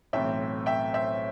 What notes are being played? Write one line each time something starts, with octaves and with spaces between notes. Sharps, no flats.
B1 A2 E3 A3 C4 E5 G5
E5 G5
C5 E5